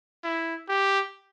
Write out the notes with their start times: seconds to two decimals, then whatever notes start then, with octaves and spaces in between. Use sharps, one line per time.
0.24 E4
0.69 G4